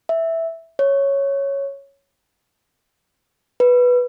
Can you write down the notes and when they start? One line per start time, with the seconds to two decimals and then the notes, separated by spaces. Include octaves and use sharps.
0.09 E5
0.79 C#5
3.60 B4